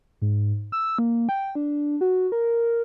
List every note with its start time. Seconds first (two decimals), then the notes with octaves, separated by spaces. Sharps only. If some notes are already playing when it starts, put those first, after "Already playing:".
0.22 G#2
0.72 E6
0.99 A#3
1.29 G5
1.55 D4
2.01 F#4
2.32 A#4